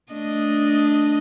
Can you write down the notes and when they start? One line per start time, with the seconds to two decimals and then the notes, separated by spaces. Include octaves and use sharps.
0.13 A3 D4 D#5